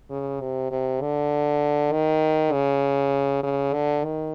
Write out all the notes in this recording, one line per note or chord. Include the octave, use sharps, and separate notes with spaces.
C#3
C3
C3
D3
D#3
C#3
C#3
D3
D#3